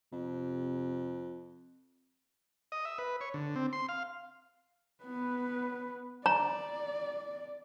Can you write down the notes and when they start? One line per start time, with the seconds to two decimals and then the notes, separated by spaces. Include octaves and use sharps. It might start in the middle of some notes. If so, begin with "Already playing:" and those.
0.12 F2 C3
2.72 D#5
2.85 E5
2.98 B4
3.21 C#5
3.34 D3
3.56 C4
3.73 C6
3.89 F5
5.04 B3 B4
6.26 D5 A#5